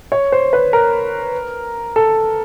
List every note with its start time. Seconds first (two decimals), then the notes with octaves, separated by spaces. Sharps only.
0.12 C#5
0.32 C5
0.53 B4
0.73 A#4
1.96 A4